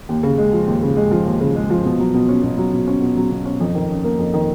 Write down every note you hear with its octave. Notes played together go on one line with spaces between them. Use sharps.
D#2
C#3
G#3
F3
D#2
C#3
G#3
F3
D#2
C#3
G#3
F3
B2
F#3
B2
C#4
B2
F#3
B2
C#4
B2
F#3
B2
C#4
F2
D#3
C#4
A#3
F2
D#3